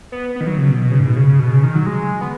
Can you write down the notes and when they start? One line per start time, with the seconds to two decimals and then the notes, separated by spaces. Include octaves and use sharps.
0.12 B3
0.36 B3
0.41 D#3
0.47 F#3
0.58 C#3
0.70 B2
0.82 B2
0.91 C#3
0.99 G#2
1.07 B2
1.16 C#3
1.29 C#3
1.39 B2
1.52 C#3
1.63 D#3
1.75 F#3
1.87 G#3
2.21 B3